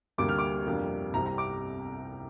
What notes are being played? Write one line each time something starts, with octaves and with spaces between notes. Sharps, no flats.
D2 C3 G3 A#3 D4 D6
F6
D6
F2 C3 G3 A#3 D4
C2 C3 G3 C4 A#5
A#5
D6